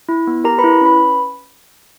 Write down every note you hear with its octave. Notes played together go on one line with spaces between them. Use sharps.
E4
B3
G4 A#4 A#5
B4 B5
E4
C#4 B4 B5